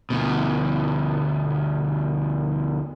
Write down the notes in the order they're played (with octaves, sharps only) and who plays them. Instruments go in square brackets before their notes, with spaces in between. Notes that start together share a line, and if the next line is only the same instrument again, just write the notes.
[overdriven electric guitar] D2 B2